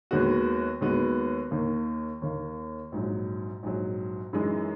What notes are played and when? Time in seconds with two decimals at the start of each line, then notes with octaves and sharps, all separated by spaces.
0.11 D#2 D#3 G#3 B3 F#4
0.81 D#2 D#3 G#3 B3 F#4
1.51 D#2 D#3 A#3
2.22 D#2 D#3 A#3
2.92 A#1 G#2 F#3
3.63 A#1 G#2 F#3
4.33 F#2 E3 G#3 D#4